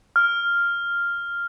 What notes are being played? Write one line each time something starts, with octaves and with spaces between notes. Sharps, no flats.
F6